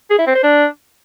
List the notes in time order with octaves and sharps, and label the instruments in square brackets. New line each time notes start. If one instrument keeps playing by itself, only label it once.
[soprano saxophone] G#4
E4
C4
C5
D4